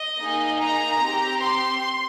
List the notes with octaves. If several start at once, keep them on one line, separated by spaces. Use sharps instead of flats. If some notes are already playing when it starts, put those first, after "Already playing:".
Already playing: D#5
A#3 D#4 G#4
A#5
C4 G4
C6